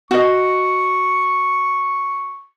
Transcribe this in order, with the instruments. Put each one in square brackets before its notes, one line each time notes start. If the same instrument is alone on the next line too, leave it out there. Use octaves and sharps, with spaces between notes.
[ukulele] F#4 D#5 [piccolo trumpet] C#6